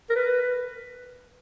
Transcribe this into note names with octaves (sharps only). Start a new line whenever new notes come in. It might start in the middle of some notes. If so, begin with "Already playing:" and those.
A#4
B4